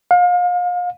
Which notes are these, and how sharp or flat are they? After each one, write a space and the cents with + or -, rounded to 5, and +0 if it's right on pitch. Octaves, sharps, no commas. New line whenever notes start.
F5 +35